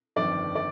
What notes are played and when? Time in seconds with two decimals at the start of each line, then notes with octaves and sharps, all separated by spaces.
0.16 G1 F2 D#3 D5
0.55 D5